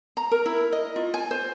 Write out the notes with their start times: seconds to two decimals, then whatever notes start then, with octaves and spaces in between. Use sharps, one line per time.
0.17 A#5
0.31 A#4
0.46 E4
0.72 D#5
0.96 F4
1.14 G#5
1.31 C5